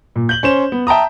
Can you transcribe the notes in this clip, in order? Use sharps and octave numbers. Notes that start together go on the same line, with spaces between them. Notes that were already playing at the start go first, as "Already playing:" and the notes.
A#2
G6 F#7 G7
C#4 C5 E7
B3
E5 G5 A5 A#5 D#6